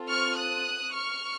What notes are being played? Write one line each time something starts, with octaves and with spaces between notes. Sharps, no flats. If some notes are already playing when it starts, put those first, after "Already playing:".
Already playing: C4 F4 A4
C#6 F6
D#6 F#6
C#6 F6